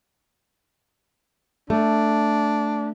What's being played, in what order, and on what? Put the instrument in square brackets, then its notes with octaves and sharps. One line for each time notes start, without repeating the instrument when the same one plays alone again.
[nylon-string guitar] A3 [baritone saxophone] D4